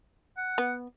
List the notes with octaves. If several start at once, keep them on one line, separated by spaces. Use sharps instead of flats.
F#5
B3